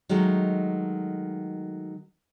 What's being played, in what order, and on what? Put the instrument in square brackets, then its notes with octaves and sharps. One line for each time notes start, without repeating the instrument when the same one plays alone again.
[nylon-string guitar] D#3 F#3 G#3 A3